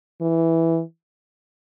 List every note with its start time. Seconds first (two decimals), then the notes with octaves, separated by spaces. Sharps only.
0.21 E3